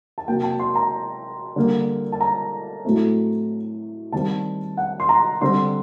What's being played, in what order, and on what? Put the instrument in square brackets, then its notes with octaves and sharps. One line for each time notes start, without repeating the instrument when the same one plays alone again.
[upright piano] A5
C3 F#3 A#3 G5
A5
C6
A#5
D3 G3 A#3
A5
A#5
A2 F#3 A3 C4
D#3 G3 C4 A5
F#5
C6
A#5
D3 G3 C4 C6